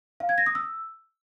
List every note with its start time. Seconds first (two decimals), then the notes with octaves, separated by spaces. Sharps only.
0.20 F5
0.29 G#6
0.38 A#6
0.46 D#6
0.55 E6